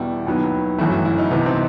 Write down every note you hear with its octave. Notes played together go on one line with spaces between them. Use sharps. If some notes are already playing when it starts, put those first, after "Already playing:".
Already playing: E2 B2 G3 E4
D#2 D#3 F#3 B3
G1 F#2 E3 A3 F#4
F#4
E4
D#4
C2 C3 E3 B3
C4